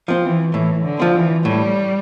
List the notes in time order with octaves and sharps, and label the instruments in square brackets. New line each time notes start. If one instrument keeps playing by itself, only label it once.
[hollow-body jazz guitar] F3 C4
[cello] E3
[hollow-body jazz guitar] A2 [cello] E3
[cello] D3
[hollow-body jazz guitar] F3 C4
[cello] E3
[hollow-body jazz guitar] A2 [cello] G3